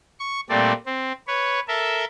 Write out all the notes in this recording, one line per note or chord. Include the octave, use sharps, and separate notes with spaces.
C#6
A#2 G3 A3 C4 D5
C4
B4 C#5
A4 A#4 E5